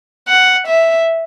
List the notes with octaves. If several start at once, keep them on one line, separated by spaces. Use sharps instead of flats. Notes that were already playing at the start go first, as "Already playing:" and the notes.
F#5
E5